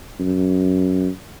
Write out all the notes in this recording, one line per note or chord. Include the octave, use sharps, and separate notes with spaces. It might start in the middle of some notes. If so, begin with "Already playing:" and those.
F#2